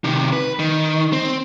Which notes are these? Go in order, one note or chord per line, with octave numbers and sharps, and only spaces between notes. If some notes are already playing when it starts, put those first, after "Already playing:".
C3 D#3
B4
D#3
C4